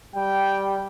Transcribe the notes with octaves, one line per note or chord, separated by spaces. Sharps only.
G3 G5